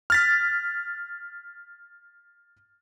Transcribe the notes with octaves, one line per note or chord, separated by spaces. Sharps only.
F6 A6 B6